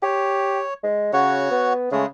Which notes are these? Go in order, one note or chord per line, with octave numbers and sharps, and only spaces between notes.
G4 C#5
G#3
C#3 F#4 C#5 F#5
B3
C#3 G#3 A3